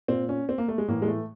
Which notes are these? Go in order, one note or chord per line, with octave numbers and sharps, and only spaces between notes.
A#2 C4
C#4
C4
A#3
A3
G#3
A2 E3 A#3
G#3
A3